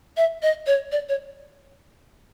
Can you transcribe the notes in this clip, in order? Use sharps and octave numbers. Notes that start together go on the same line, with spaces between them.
E5
D#5
C#5
D5
C#5